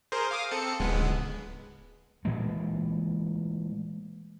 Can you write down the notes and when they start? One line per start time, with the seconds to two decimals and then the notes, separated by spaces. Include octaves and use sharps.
0.12 G#4 A#4 C5
0.31 F5 D6 D#6
0.51 C4 A4 C#7
0.80 D1 C#2 G#3 B3
2.25 A#2 E3 G#3 A3